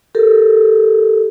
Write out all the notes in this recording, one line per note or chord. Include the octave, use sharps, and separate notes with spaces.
G4 A4 A#4